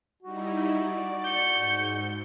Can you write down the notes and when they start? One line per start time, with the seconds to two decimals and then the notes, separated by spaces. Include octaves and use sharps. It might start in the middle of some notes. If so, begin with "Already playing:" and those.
0.23 G3 D#4 E4 F#4
0.73 D5
1.24 G6 C#7
1.55 G#2